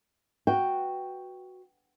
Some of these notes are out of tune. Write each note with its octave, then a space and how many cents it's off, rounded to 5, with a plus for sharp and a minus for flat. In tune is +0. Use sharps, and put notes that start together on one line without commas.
F#4 +0 B4 +0 G5 +0